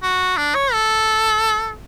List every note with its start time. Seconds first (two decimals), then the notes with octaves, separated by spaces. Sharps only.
0.03 F#4
0.37 D4
0.55 C#5
0.73 A4